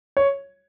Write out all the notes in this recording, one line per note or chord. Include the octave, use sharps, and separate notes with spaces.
C#5